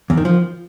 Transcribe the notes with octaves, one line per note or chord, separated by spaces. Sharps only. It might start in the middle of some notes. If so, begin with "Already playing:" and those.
E2
D#3
F3